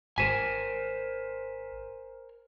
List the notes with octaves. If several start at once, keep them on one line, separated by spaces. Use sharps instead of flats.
G#1 A#4 C5 G#5 B6 D#7 E7